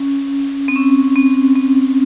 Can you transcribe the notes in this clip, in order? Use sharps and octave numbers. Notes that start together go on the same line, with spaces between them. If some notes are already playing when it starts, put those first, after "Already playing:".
Already playing: C#4
C4
C#4
C4
C4